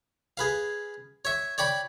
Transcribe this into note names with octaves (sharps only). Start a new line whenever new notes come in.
G#4 B4 F5
C#5 E5
C#5 D5 G5 B5